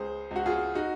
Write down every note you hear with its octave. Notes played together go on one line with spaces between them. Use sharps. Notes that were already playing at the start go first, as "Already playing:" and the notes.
Already playing: C#2 G#4 C5
C#2 F#4
F4 G#4
D#4 F#4